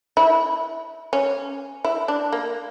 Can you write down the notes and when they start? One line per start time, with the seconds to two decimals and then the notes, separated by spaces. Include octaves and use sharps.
0.17 E4
1.13 C#4
1.85 E4
2.08 D4
2.33 A#3